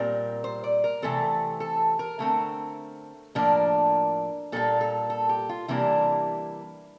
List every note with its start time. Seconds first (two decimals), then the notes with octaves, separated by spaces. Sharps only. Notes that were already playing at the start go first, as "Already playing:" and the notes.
Already playing: A#2 G3 C4 A#4
0.44 C5
0.64 D5
0.84 A#4
1.02 C3 E3 A3 C4 A4
1.60 A4
1.99 A#4
2.19 D3 A3 C4
3.35 A2 F3 A#3 D4 A#4
4.52 A#2 G3 A#3 A4
4.81 A4
5.10 A4
5.29 G4
5.49 F4
5.68 C3 E3 G3 A#3 D4 E4